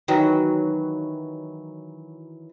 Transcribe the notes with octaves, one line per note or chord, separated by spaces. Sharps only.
D#3 E3 F#3